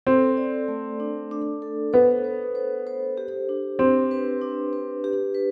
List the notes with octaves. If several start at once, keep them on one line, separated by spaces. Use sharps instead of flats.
C4 A4
D5
A3
D4
D4
A4
B3 C5
C5
C5
C5
G4
D4
C4 D4
B4
D4
B4
G4
B4